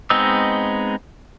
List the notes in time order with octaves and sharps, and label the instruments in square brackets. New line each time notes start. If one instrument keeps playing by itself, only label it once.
[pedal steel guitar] G#3 B3 C4 D#4 E6